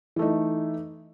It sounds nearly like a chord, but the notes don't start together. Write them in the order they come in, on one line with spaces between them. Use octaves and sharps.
E3 A3 D#4